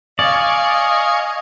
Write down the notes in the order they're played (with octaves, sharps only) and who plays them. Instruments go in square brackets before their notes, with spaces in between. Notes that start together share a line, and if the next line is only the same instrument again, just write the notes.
[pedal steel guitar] D5 [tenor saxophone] D#5 [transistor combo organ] F5 G#5 C#6